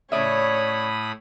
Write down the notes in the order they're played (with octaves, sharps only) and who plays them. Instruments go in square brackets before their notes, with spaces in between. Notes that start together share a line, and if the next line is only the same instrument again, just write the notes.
[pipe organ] A2 B5 D#6 [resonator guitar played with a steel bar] C#3 D5 E5 [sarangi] C#5